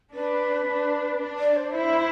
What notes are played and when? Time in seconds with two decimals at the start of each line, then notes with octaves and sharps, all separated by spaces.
0.13 D4 B4
0.67 D4
1.20 D4
1.38 D5
1.56 C5
1.74 E4